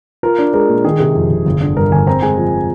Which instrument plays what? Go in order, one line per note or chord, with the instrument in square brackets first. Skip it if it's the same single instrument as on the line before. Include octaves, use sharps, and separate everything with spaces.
[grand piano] F4 A#4
D4
G#3 A#4
A#2
D#3 G#4
C3 G#4
F2
F1
G1
D3
G2 A#4
G1 G#5
C4 A#5
G#3 G#5
F3